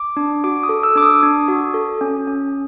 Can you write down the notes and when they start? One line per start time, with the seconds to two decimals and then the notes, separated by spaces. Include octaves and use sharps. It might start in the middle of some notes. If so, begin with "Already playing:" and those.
Already playing: D6
0.17 D4
0.44 F#4 D6
0.63 D#6
0.69 A4
0.83 E6
0.96 D4 D6
1.03 D#6
1.23 D4
1.48 F#4
1.74 A4
2.01 C#4
2.27 C#4